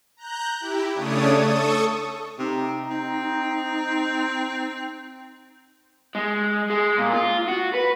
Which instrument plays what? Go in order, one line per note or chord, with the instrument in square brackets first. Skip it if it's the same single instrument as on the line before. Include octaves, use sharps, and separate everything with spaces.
[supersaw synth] A#5 F#6 G6
E4 G4
C#3 A3 D4 C#5 D#6
A4 C#6 D#6
[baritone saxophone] C3 [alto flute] D#4
[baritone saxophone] C4
[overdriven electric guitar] G#3
G#3
A#2
F4
F#4
B4